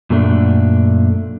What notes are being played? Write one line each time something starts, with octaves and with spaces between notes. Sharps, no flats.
F#2 A#2 A3 D4